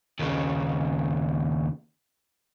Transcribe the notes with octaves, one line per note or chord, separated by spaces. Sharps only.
D#2 C#3